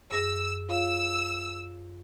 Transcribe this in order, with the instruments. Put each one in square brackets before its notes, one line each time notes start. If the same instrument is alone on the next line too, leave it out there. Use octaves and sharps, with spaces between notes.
[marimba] F#2 G#4 A#6 [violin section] E6
[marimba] F4 C#5 F5 [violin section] E6